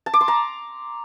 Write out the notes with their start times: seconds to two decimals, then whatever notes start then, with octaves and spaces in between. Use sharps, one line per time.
0.06 A5
0.14 D6
0.21 C6
0.28 A#5